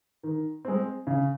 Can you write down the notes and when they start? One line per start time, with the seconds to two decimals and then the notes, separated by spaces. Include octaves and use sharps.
0.23 D#3
0.65 G#3 C4
1.07 C#3